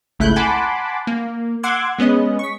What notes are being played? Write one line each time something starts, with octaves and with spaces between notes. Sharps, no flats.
G#1 C#2 A3 E4 F#6 G6
F#5 G#5 A5 B5 C6 D6
A#3
F#5 C6 D6 E6 F#6 G#6
G#3 B3 C#4 D#5
C#6 B6